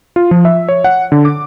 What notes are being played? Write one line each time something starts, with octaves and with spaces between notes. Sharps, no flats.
F4
F3
E5
C#5
F#5
D3
D6